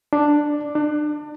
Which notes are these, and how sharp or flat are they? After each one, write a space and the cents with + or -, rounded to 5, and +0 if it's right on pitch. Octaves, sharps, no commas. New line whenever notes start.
D4 +5
D4 +30